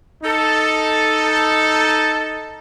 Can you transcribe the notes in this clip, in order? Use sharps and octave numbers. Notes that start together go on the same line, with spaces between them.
D#4 A4